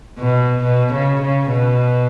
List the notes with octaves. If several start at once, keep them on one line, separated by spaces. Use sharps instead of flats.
B2
B2
C#3
C#3
B2